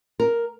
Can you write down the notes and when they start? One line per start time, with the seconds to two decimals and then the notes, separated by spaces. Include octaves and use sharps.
0.20 A#4